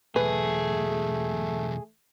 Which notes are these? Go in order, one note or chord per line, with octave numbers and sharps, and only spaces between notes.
B1 E2 A3 G#4 B4